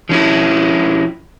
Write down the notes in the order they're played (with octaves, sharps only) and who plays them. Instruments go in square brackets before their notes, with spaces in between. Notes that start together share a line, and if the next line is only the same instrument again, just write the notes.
[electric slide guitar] F3 C#4 E4